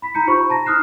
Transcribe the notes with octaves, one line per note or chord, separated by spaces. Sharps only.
B5 B6
D#4 A#5 G6 C#7
F4 G4 C5 B5 C#6
A5 A#5 A#6
D#4 D#6 F6 F#6 C7 E7